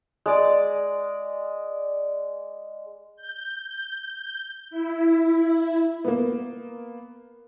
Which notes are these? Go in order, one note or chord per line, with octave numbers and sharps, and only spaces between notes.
G#3 D5
G6
E4
A#3 B3